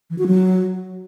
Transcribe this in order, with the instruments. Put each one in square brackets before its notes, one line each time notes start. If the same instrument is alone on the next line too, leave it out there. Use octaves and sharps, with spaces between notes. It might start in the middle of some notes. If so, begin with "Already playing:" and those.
[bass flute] E3
F#4
F#3